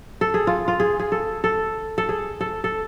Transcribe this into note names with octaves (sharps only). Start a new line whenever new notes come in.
A4
G#4
F4
F4
G#4
G#4
A4
A4
A4
G#4
A4
A4